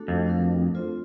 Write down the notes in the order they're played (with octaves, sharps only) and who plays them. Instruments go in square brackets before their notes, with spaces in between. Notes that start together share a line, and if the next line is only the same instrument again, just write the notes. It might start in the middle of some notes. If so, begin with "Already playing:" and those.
Already playing: [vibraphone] A3 D4 F#4 A4
[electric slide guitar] F2
[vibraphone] A3 D4 F#4 A#4
C4 F4 A4 C5